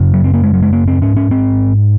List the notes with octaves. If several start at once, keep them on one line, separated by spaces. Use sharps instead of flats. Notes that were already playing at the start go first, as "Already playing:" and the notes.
Already playing: F#2 C#3
F#3
C4
A#3
G#3
F#3
G#3
A#3
C4
G#2 C#4
C#4
C4